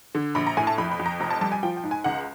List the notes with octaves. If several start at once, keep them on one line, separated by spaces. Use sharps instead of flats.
D3
A#1 B5
A#5
A2 G#5
A5
F2 B5
B5
F2
A#5
F1 A#5
A5
G3 A5
G#5
F3 G5
G5
G#2
G#5
C#2 F#5